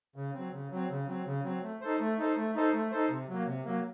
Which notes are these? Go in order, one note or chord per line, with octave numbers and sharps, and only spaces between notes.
C#3
F#3 C4
C#3
F#3 C4
C#3
F#3 C4
C#3
F#3 C4
A3
D#4 A4 C5
A3
D#4 A4 C5
A3
D#4 A4 C5
A3
D#4 A4 C5
C3
F#3 A#3
C3
F#3 A#3